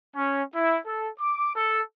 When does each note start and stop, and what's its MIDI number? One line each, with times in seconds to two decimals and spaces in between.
0.15 0.43 61
0.54 0.78 64
0.86 1.09 69
1.18 1.53 86
1.54 1.82 69